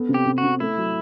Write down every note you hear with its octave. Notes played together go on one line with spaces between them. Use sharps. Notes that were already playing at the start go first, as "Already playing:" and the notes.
Already playing: B3 A4
C3
G4
C3
F#4
C3
A3 E4
F#3